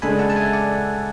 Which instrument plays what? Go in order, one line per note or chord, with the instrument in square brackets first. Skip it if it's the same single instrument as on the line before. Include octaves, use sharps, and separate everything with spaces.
[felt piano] C#3 G#3 D4 A4 [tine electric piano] G#5 B5
[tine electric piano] F#5 A5
A5
E5 G#5
D5 F#5